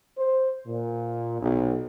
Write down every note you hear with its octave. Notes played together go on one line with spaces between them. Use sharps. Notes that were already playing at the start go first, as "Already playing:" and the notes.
C5
A#2
B1